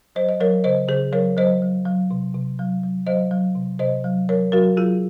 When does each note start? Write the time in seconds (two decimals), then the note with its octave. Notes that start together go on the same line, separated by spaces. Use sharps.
0.15 F#3 C5 D#5
0.29 D#5
0.40 F#3 A#4 C#5
0.64 C#3 C5 D#5
0.88 C#3 G#4 C5
1.13 F#3 A#4 C#5
1.37 F#3 C5 D#5
1.62 F#3
1.85 F#3
2.11 C3
2.35 C3
2.59 F#3
2.83 F#3
3.07 F#3 C5 D#5
3.31 F#3
3.55 C3
3.79 C3 C5 D#5
4.04 F#3
4.29 F#3 A#4 C#5
4.52 F#3 F#4 A#4
4.77 F#3 F4 G#4